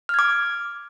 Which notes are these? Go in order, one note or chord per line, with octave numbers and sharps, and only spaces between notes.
D6 F6 G#6